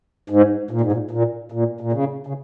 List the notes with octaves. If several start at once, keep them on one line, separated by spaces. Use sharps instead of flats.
G#2
A#2
G#2
A#2
A#2
A#2
A#2
C#3
C#3